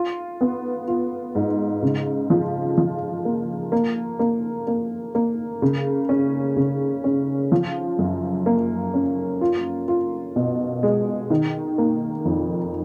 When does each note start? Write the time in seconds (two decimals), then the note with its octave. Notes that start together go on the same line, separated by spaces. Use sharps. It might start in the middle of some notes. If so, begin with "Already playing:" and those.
Already playing: F4
0.41 B3
0.88 F4
1.35 G#2
1.82 C#3
2.30 F3
2.78 F3
3.25 A#3
3.72 A#3
4.19 A#3
4.67 A#3
5.15 A#3
5.62 C#3
6.09 C#4
6.56 C#3
7.04 C#4
7.52 F3
7.99 F#2
8.46 A#3
8.94 C#4
9.41 F4
9.88 F4
10.36 B2
10.83 G#3
11.30 D#3
11.78 A#3
12.25 F2